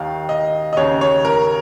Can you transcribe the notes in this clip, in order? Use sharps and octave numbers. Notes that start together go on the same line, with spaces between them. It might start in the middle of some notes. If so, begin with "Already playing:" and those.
Already playing: D#2 D#3 F5
D#5
D#5
D#2 C#3 C#5
C#5
A#4